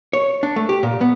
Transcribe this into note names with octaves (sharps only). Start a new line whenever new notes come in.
C#5
D4
A3
G4
A#2
B3